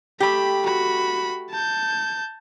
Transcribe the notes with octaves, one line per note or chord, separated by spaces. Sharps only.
A3 G4 B5
F#4 B5
A5 G6